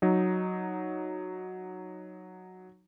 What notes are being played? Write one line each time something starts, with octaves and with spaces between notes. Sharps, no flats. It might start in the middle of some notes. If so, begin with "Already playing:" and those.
F#3 D#4